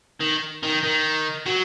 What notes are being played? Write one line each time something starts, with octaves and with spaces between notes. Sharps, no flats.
D#3
D#3
D#3
F#3